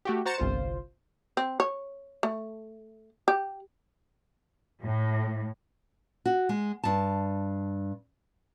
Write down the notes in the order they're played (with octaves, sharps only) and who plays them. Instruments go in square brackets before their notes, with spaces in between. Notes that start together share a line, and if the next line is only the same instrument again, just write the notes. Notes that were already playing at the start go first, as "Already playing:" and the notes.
[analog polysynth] A3 F#4 G4
F#4 C5 A#5 A6 C#7 E7
G1 C2 F4 C5
[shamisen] C4
C#5
A3
G4
[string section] A2
[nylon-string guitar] F#4
G#3
G2 A5